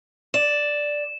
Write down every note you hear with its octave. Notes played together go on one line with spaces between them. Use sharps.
D5 E7